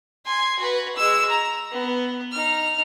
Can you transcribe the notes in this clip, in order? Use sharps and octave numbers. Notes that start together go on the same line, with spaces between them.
G#5 C6
F#4 B4
G#3 E6
A#5
B3
D#4 F6